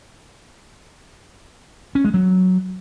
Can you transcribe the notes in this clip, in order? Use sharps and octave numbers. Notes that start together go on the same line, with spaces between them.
C#4
G#3
F#3